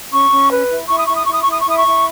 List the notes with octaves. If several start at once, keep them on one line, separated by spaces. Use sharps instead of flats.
C#4 C#6
C#4
B4
E4
E4 C#6
D#6
E4 C#6
D#6
E4 C#6
D#6
E4 C#6
D#6
C#6
E4 D#6
C#6
E4